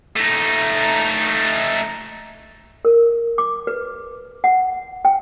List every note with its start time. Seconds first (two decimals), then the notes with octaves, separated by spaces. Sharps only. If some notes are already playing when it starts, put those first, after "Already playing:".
0.16 A3 D#4
2.85 A#4
3.38 D6
3.67 B4
4.44 F#5
5.05 G5